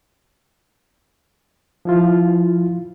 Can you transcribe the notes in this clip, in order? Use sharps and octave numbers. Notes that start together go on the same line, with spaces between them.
F3 E4 F4